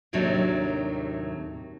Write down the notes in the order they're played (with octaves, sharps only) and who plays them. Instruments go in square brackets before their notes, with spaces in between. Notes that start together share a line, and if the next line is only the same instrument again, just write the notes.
[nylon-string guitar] D#2 A2 C3 D#3 F#3 D4